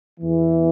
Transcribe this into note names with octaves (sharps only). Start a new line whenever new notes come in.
E2 E3